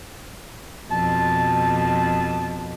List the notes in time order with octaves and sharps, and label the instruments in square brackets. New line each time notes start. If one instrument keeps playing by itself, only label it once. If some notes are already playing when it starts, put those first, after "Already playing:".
[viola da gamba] F2 B2 [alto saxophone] A5